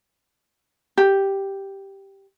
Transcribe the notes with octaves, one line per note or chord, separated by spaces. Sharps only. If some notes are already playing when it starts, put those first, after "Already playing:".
G4